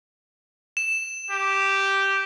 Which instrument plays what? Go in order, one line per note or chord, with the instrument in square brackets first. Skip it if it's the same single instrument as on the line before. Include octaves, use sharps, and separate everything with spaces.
[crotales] E7
[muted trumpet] G4